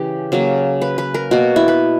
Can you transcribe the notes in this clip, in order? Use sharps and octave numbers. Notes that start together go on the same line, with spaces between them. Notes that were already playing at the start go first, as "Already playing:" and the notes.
Already playing: C#3 E3 G4
C#3 F#3 A#3
B4
B4
A#4
B2 A#3 F#4
E4
B4